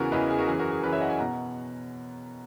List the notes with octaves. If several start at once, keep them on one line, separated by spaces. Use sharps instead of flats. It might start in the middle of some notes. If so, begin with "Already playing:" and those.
Already playing: E2 C#3 E3 F#4 A#4
E2 C#3 E3 B4 D#5
G#4
F#4 A#4
F#2 E3 G#4
F#4 A#4
G#4
F#2 E3 G#4 B4
C#5 E5
D#5 F#5
E5 G#5
B2 F#5 A#5